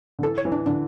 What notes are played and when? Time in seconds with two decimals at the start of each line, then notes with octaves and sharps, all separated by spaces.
0.19 D3
0.23 E3 A4
0.38 C#5
0.45 E3
0.52 D4
0.66 D3 D4